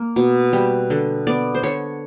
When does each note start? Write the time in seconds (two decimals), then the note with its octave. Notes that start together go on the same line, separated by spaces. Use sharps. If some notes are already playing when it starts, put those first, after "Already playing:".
Already playing: A#3
0.16 B2
0.53 G3
0.90 D3
1.27 B3 D5
1.54 C5
1.63 D3 C#5